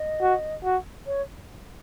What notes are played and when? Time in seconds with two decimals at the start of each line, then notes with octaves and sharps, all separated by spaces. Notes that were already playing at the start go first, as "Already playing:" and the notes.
Already playing: D#5
0.21 F#4
0.64 F#4
1.07 C#5